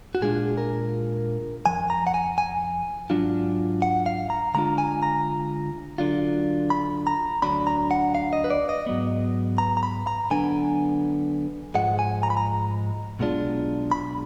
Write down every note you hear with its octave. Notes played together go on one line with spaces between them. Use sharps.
F#4
A#2 G#3 D4 F4 G#4
A#4
F2 F3 G#5
A#5
F#5
G#5
G#5
G#2 F#3 D4 F4
F#5
F5
A#5
D3 G#3 D4 F4 A#5
G#5
A#5
D3 F#3 D4 F4
B5
A#5
D2 D3 F#3 D4 B5
A#5
F#5
F5
D#5
B4
D5
D#5
G#2 F#3 B3
A#5
A#5
B5
A#5
D3 F#3 B3 D4 G#5
G#2 F3 G#3 F#5
G#5
A#5
B5
A#5
B1 B2 G#3 D4 F4
B5